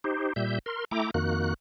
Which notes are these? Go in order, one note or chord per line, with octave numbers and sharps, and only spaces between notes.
D#4 G4 C5
A#2 G3 E5 G6
A#4 C6
A3 E4 G5 A#5 D6
F2 D#3 A#3 F#4 F#6